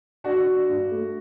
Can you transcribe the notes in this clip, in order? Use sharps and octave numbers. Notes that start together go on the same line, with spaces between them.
D4 F#4
D4
G2
A3